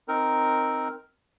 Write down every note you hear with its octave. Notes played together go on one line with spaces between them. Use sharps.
C4 D#4 A#4